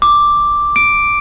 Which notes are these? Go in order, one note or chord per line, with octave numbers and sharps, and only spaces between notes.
D6
D7